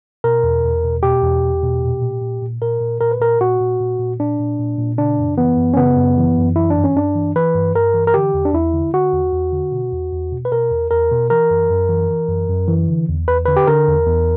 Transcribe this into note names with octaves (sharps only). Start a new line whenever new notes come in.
B2 A#4
E2
E2
B2
B2 G4
E2
E2
B2
A#2
A#2
A#2
A#2
A#2 A#4
A#2
A#2 A#4
B4
A#2 A#4
A#2 F#4
A#2
A#2
A#2
A#2 D4
A#2
A#2
A#2
C#3 D4
F#2
E3 B3
F#2
C#4
C#3 B3
F#2
E3
F#2
E3 E4
D4
G2
C#4
G2 D4
E3
E3 B4
G2
G2 A#4
E3
A#4
D3 G4
E2
D4
E2 E4
D3
D3 F#4
E2
E2
D3
B2
E2
E2
B2
B4
B2 A#4
E2
E2 A#4
B2
E3 A#4
F#2
F#2
E3
E3
F#2
F#2
E3
D3
E2
E2 B4
D3 B4
G4
D3 A#4
E2
E2